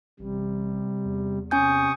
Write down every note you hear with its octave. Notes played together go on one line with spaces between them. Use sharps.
A1 C3 G3
E2
C3 C#4 G#5 C#6 D#6 G6